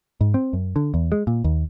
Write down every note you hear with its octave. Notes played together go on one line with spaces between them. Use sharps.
G#2
C4
F#2
D3
E2
G#3
A#2
D#2